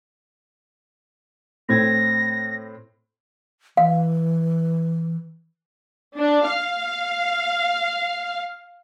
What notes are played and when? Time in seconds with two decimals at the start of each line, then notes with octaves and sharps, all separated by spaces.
1.69 A2 C4 G#6 A#6
3.77 E3 F5
6.17 D4
6.48 F5